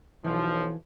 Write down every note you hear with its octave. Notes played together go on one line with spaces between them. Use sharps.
B1 E3 F3